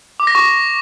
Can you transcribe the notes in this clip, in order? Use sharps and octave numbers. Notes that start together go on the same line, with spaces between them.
D6
A#6
C#6